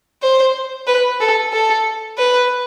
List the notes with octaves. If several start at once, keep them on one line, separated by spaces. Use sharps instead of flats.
C5
B4
A4
A4
B4